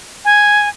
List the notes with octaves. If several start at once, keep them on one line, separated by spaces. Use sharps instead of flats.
G#5